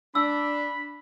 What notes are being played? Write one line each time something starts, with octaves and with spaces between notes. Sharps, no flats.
D4 B5 E6